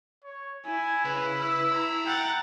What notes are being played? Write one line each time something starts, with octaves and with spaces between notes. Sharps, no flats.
C#5
E4 G#5
C#3 B4
B4 E6
A#5 B5
F#5 G5 A6